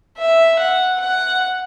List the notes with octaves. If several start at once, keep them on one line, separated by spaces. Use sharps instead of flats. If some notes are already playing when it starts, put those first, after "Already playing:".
E5
F#5
F#5